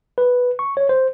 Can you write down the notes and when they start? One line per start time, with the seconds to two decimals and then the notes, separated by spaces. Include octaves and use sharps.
0.18 B4
0.59 C#6
0.77 C#5
0.89 C5